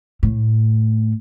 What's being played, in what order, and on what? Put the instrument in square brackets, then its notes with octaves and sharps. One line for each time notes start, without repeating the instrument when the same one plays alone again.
[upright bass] A2